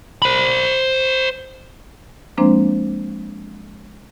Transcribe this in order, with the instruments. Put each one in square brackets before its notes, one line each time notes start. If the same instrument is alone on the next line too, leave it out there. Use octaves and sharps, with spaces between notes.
[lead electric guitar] C5 B5
[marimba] F3 G#3 A#3 C4 D4 C5